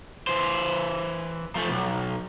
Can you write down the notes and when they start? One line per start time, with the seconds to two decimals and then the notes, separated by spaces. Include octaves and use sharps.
0.27 E3 C5
1.55 F3 A3
1.69 B1